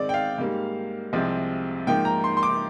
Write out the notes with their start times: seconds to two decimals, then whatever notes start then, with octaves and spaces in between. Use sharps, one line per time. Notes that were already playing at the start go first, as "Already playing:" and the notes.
Already playing: G#2 D#3 G#3 C4 D5
0.09 G5
0.14 F5
0.38 G#2 G3 A#3
1.13 C2 C3 F3 G#3 C4
1.87 G#2 F3 A#3 G5
2.05 A#5
2.24 C6
2.37 C6
2.43 D6